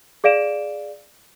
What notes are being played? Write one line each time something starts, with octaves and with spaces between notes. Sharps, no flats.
G#4 D5 F5 D7 E7